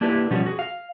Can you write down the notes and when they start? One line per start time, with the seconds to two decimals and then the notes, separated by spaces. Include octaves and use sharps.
0.01 A#3 D4 E4 G4 B4
0.31 B2 F3 G3 B3 C#4 F#4
0.46 F#4 G#4
0.59 F5